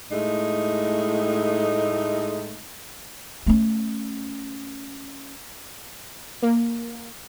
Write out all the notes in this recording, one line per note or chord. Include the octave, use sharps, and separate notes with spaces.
A2 G#3 A3 D#4
A3 C#4
A#3